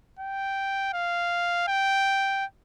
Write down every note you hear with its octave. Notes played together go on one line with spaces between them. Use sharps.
G5
F5
G5